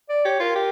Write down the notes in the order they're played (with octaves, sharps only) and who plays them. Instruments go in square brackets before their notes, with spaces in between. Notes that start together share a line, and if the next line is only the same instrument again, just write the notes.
[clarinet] D5
[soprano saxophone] G4 [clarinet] C#5
[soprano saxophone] F4 [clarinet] A#4
[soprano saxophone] G4